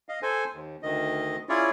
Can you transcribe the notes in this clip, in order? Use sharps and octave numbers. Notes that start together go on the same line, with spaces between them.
D#5 F5
A4 C5 G#5
D#2
D2 D#3 D#5
C#4 E4 F4 G#4 C#5 D5